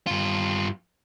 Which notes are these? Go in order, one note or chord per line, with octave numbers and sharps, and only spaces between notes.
G2 F4